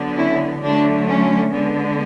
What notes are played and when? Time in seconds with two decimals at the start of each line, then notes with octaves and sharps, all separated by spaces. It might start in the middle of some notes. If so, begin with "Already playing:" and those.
Already playing: D3 F#3 B3
0.17 C#4 E4
0.62 D3 F#3 A3 D4
1.08 C#4
1.53 D3 G#3 B3